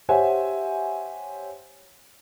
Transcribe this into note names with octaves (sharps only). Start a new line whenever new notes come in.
G4 C5 C#5 E5 F#5 G#5